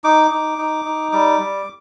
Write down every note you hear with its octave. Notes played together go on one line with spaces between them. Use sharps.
D#4 D6
D#4
D#4
D#4
G3 D6
G3